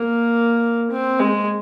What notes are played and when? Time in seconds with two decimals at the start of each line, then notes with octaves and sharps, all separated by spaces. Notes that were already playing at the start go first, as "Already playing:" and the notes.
Already playing: A#3
0.91 C4
1.20 G#3